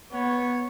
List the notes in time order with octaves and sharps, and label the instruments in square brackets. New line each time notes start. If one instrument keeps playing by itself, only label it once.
[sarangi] B3 [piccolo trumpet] C#5